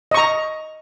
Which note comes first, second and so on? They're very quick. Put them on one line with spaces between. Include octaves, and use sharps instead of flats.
D#5 C#6 A#5